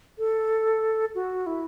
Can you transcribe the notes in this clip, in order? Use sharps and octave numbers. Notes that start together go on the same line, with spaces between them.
A4
F#4
E4